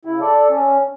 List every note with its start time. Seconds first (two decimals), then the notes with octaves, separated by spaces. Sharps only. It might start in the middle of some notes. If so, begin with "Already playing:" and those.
0.05 C#3 E4
0.20 A4 D5
0.50 C#4